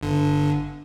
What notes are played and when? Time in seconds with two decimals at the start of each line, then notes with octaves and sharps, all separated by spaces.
0.01 G1 D3